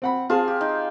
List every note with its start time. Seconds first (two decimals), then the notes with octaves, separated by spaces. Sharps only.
0.02 C4 F#5 B5
0.30 C4 F4 G#4 A5
0.48 G4
0.61 D#4